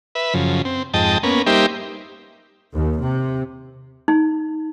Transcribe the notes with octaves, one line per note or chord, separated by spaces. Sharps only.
B4 E5
F#2 C#3 F3
C4
F2 G#2 D#5 G5 A5
A#3 B3 C#4
G3 A#3 D#4 G4 C5 E5
D#2
C3
D#4